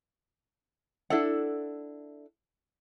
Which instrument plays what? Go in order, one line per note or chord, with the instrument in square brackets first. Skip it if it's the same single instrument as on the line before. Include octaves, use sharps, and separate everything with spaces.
[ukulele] D4 E4 A4 F#5